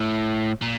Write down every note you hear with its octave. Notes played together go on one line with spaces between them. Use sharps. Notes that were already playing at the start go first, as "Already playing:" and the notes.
Already playing: A2
A#2